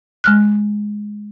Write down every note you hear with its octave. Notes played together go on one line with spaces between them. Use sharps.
G#3 F6 F#6